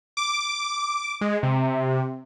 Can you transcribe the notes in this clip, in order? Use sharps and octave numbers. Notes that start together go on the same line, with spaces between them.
D6
G#3
C3